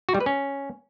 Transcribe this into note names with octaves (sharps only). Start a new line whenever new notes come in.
F#4
G3
B4
C#4